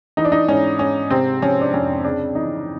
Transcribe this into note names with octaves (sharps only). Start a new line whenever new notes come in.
E3 D#4
D4
D#4
G#2 C#4
G#2 C#4
C3 C4
F3 C#4
D4
F2 C#4
C#3 D4
E3 D#4